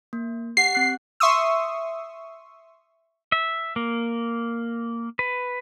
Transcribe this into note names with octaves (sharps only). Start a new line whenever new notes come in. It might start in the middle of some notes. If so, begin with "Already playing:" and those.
A#3
G4 F#5 C7
C4 F#6
E5 C6 C#6 D#6 E6
E5
A#3
B4